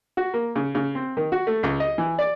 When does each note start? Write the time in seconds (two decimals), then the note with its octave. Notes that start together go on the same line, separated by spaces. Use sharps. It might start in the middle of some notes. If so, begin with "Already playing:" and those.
0.17 F#4
0.34 A#3
0.56 C#3
0.75 C#3
0.95 C4
1.17 D#3
1.32 F#4
1.47 A3
1.63 C#2
1.80 D#5
1.98 E3
2.19 D5